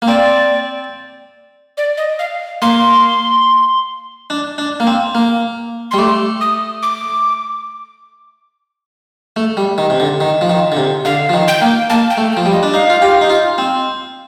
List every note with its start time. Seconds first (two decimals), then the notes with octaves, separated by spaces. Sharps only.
0.02 A#3
0.07 C4 D5
1.77 D5
1.97 D#5
2.19 F5
2.62 A#3 C6
4.30 D4
4.58 D4
4.80 A#3
4.87 C4
5.15 A#3
5.91 G3 C6
5.98 A3 D6
6.41 D#6
6.83 D6
9.36 A3
9.57 G3
9.78 D#3
9.90 C3
10.00 D3
10.20 D#3
10.41 F3
10.49 D#3
10.72 D3
10.77 C3
11.05 D3 F5
11.29 F3
11.34 D#3
11.48 G5
11.62 A#3
11.90 A#3 A5
12.10 G5
12.17 A3
12.32 G5
12.37 F3
12.46 G3
12.53 D#5
12.63 D4
12.74 D#4 F5
12.90 F4
13.02 G4
13.21 D#4
13.30 F4
13.58 C4